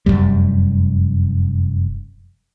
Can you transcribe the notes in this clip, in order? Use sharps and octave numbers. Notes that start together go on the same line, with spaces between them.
F1 C2 F#2 G3